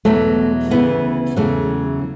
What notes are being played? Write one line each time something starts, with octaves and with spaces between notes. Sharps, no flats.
E2 B2 F#3 A3
D2 C#3 E3 B3
E2 C#3 F#3 A3